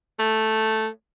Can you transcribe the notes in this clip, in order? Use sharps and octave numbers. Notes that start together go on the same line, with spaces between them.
A3